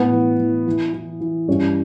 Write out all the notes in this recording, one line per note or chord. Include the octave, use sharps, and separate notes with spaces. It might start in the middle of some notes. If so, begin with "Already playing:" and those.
Already playing: A2 E3 B3
E3
E3
E3
E3
E3
G2 C#4